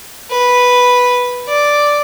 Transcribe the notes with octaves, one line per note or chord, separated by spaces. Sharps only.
B4
D5